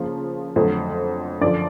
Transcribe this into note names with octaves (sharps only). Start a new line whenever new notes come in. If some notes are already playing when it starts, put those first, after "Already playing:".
Already playing: C#3 F3 A#3
F2 D3 F#3 A3 C4
F#2 D3 F3 D5